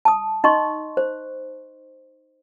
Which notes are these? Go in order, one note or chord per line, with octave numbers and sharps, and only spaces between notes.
A5 D#6
D#4 D#5 C6 C#6
C5